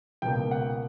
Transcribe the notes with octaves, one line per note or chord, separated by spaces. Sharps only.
C#2 B2 A#3 G5
F#5